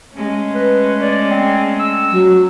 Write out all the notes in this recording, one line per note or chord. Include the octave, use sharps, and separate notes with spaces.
G#3 A3 C#4
B4
D5
C4
E6
F#3